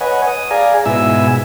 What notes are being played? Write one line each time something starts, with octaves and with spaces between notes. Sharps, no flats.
B4 C#5 D#5 F#5 G#5
D#6
G#4 D5 F5 G#5 A#5
G#2 B2 E4 E5 G#5 E6